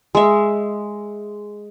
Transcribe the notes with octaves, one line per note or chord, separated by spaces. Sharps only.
G#3 E5